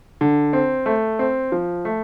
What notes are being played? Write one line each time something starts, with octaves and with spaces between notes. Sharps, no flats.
D3
C4
A3
C4
F3
A3